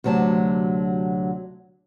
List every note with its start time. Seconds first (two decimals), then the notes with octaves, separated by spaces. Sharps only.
0.04 D2 C3 F#3 A#4 A5